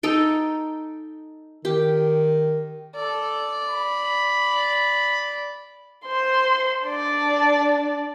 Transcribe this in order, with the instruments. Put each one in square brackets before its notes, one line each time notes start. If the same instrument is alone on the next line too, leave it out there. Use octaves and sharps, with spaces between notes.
[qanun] D#4 A4 G5
[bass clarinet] D#3 [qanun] G4
[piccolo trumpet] A4 [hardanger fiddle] D5
[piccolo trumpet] B5
[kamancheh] C5 C6
D4 D5